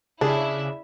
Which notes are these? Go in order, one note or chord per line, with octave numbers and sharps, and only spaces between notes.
C#3 D4 E4 G#4 E5